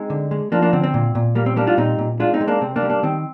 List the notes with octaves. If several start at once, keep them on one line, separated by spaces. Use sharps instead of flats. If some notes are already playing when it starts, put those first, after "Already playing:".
Already playing: G#3 C4 D#4
D3
G#3
F3 A#3 D4
A#3 D4
D3 C4
C4
A#2
A#2
G3 A#3
C4
G3 A#3 D4
D4 F4
A#2 C4 D#4
A#2
G#3 D4 F4
C4 D#4
G#3
A#3 D4
C3 C4
A#3 D4
G3
A#3 D4
D#3 C4